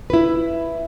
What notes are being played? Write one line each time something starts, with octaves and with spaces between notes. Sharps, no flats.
E4 B4